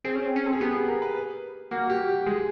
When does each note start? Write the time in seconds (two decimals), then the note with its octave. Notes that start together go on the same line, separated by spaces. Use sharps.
0.04 C4 G#4
0.15 C#4
0.26 C4
0.36 C#4
0.45 C4 A4
0.53 G#4
0.60 B3 G4
0.74 G#4
0.88 A#4
1.02 B4
1.71 A#3 F#4
1.90 G4
2.08 G4
2.26 G#3 G#4